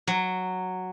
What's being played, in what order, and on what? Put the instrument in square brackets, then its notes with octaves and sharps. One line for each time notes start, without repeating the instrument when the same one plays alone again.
[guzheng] F#3